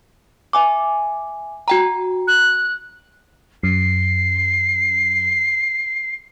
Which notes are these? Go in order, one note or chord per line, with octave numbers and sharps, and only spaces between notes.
E5 G#5 D6
F#4 G5 A#5
F#6
F#2 C7